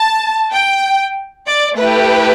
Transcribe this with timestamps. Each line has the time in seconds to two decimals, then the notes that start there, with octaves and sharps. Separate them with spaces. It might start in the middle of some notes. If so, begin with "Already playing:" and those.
Already playing: A5
0.52 G5
1.47 D5
1.77 A3 E4 G4 B4